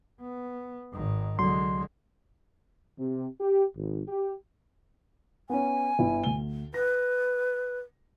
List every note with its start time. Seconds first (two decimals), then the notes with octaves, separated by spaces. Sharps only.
0.21 B3
0.93 G#1 D#3
1.39 C2 D3 F#3 G#3 C6
2.99 C3
3.41 G4
3.76 G#1
4.08 G4
5.50 B3 C#4 G#5
5.99 G1 E4
6.24 D2 G7
6.74 B4 A#6